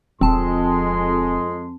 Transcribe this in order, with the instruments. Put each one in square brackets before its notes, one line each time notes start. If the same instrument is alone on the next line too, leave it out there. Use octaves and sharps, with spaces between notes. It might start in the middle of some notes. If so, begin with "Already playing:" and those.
[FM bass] D#1 [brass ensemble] F2 [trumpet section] G#3 C6 [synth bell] C4 A5